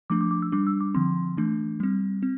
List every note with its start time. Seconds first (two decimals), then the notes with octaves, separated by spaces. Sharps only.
0.10 F3 A3 D4 D6
0.21 D6
0.31 D6
0.42 E6
0.52 G3 D4 D6
0.67 E6
0.81 D6
0.94 D3 F3 C4 C6
1.37 E3 A3 D4
1.80 G3 C4
2.23 C4